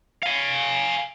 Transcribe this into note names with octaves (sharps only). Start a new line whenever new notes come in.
F5 G#5